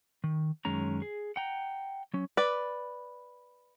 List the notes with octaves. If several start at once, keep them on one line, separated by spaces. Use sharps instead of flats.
D#3
F#2 D#3 G#3 C#4 A#5
G#4
F#5 G5 A#5
F#3 C#4
B4 D5